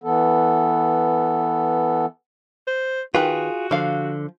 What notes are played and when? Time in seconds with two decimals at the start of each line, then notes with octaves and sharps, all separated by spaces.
0.04 E3 B3 A4
2.67 C5
3.15 D#3 F4 F#4 G#4 B4
3.71 D3 F3 F5